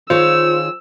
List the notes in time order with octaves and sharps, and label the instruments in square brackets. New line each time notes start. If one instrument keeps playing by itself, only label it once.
[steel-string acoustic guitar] D#3 G#4 C#5 [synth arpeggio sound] F4 [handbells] C5 [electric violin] E6